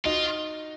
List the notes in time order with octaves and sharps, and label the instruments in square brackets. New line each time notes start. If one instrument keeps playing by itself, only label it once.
[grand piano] D#4 F#4 [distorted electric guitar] F4